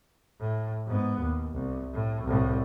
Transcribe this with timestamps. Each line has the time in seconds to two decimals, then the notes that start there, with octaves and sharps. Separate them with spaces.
0.41 A2
0.87 G#2 B3
1.21 D#2
1.53 C2
1.94 A2
2.24 C2 A2